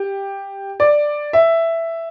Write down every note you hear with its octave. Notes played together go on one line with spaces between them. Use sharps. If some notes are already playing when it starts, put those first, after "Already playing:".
Already playing: G4
D5
E5